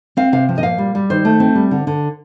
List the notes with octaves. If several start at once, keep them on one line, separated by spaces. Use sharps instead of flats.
C4 F5
C3 F5
F3
D#5
A#2 F5
G3
G3
D#3 C5
A3
C4
G3
D3
D3